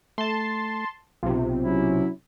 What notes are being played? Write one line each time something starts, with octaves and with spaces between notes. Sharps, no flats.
A3 A5 C6
B1 C3 F4
F#3 C#4 E4